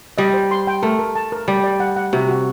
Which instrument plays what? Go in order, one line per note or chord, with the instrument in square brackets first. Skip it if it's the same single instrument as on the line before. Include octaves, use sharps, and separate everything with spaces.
[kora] G3 [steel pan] D#5
[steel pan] C5
C6
G5
[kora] A3 [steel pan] A#4
[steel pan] A#4
A5
A#4
[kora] G3 [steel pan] D5
[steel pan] D5
F#5
F#5
[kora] C3 [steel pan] F#4
[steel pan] F#4